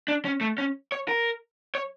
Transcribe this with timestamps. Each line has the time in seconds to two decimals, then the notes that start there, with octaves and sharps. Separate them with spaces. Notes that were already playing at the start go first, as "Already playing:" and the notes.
0.08 D4
0.25 C#4
0.41 A3
0.58 C#4
0.92 C#5
1.08 A#4
1.75 C#5